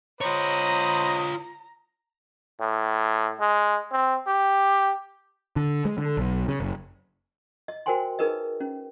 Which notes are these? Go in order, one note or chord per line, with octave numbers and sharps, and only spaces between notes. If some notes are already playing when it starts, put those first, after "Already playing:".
F4 C5 C#5 D#5 A#5 B5
A2
G#3
C4
G4
D3
G#3
D3
B1
C#3
F#1
D#5
F#4 A#4 C5 G5 G#5 C6
D#4 G#4 A#4 B4 D#5
C#4